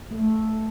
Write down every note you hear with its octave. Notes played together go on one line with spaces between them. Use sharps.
A3